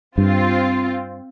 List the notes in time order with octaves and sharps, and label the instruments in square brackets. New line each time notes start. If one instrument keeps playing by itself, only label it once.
[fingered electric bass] G2 [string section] C4 F4